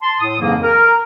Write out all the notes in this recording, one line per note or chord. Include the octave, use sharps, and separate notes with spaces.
A5 C6
A2 D#6
F2 G#2 C#3 E3 F#3 A#3
A#4